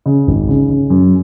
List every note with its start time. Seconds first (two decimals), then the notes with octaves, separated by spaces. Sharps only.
0.06 C#3
0.27 G#1
0.48 C#3
0.69 C#3
0.90 F#2